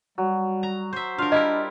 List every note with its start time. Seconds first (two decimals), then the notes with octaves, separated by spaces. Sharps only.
0.18 F#3 G3
0.63 A#5
0.93 C5 E5
1.18 D4 F4 A#4 F5
1.32 G3 E4 A#4 D#5